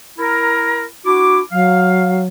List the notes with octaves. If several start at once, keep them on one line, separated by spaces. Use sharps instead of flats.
E4 A#4
D4 E4 F#4 D6
F#3 F5